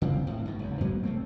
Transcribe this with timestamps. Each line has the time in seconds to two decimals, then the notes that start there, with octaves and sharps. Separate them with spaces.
0.02 C#3 C4
0.27 A2
0.46 G#2 B2
0.59 F#1 E2
0.81 G2 F#3 A#3 B3
1.03 C2 A3 C4